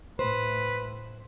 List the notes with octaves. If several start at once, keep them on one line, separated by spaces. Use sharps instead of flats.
A2 B4 C5